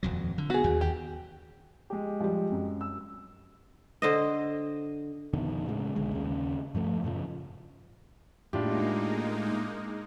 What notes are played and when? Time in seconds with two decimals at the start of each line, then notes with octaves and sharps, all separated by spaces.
0.03 D#1 F2 F#3
0.38 D3
0.50 B3 F#4 G#4
0.64 D#2
0.81 G4
1.90 G#3 G4
2.20 F3 G3
2.52 F#2
2.81 E6
4.02 D3 C5 D#5
5.33 F2 B2 D3 D#3
5.66 A2 C#3 F#3 G#3
5.95 B1 D3 G#3
6.12 D#2 C#3
6.75 G2 F3 A3
7.04 F#2 A#2 C#3 F3
8.53 A2 G#3 A#3 D4 D#4 F4 G4